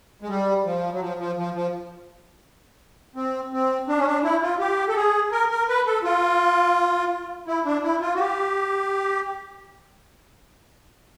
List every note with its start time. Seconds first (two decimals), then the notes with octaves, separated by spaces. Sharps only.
0.22 G#3
0.28 G3
0.65 F3
0.93 F#3
1.01 F3
1.19 F3
1.37 F3
1.54 F3
3.16 C4
3.52 C4
3.88 D4
3.98 C#4
4.06 D4
4.24 E4
4.42 F4
4.59 G4
4.89 A4
4.96 G#4
5.32 A#4
5.50 A#4
5.68 B4
5.86 A4
6.03 F4
7.47 E4
7.65 D4
7.83 E4
8.01 F4
8.15 F#4
8.19 G4